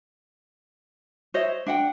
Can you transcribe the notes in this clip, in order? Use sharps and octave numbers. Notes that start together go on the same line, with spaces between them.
C5 C#5 D#5 E5
D4 F#5 G5